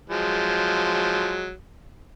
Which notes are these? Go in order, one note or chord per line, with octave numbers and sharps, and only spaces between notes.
F3 F#3 G#3